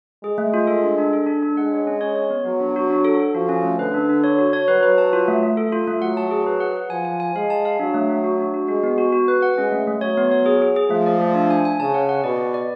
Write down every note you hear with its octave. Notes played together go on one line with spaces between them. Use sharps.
G#3 G#4
A3
F4
A4
D4
D4
A4
D4
D4
G#3 F#5
C#5
C#4
C#5
C#5
B3
F#3 B3
D4
F#4
D4
A4
A4
F3 F#4
C#4
A3
D3 B4
D4
D4
C#5
F#4
C#5
F#3 B4
B4
A5
F4
A3
A3
A4
F4
A3
F#3 F#5
A5
G#4
B4
F#5
F#5
F3 G#5
G#5
G#5
G#3 F5
A5
F5
F#3 D4
A3
A3
F#4
D4
F#4
G#3 F#4
B3
F#4
F#4
B4
F#5
G#3 C#4
A3
A3
F#3 C#5
B3
C#5
G#4
G#4
G#4
F3 A3
D5
A3
D4
G#5
G#5
C#3 A5
F#5
F#5
B2 D5
D5
D5